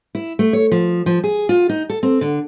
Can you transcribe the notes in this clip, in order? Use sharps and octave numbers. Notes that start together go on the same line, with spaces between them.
E4
A3
C#5
F3
F3
G#4
F4
D#4
A4
C4
D3